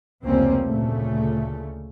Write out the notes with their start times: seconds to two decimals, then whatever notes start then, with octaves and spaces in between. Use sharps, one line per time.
0.24 F1 C#2 G3 A#3 C4 C#4
0.64 D2 A#2 C#3 A3